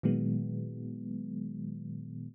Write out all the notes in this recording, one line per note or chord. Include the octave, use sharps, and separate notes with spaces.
A#2 D#3 F#3 G#3 B3